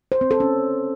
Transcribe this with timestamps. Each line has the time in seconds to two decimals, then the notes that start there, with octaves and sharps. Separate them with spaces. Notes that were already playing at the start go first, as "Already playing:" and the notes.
0.12 C5
0.21 C4
0.31 A4
0.40 C#4